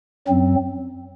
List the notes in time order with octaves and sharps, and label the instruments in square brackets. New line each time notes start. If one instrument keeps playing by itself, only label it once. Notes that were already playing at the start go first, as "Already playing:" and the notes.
[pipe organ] F#2 F#3 C4